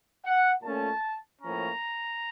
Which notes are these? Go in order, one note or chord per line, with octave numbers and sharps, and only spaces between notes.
F#5
A#2 A3 C#4 A5
A2 F3 A#3 C#4 A#5